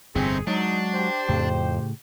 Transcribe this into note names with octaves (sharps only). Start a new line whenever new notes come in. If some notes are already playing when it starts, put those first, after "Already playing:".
G1 F2 C3 A3 C4 D#4 G#4
F#3 G#3 D4 D#4
G4 C5
F2 A2 C#3